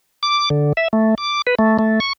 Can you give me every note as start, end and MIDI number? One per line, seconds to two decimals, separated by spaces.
0.23 0.49 86
0.50 0.73 50
0.77 0.88 76
0.93 1.15 57
1.18 1.42 86
1.47 1.55 71
1.59 1.78 57
1.79 2.00 57
2.00 2.13 85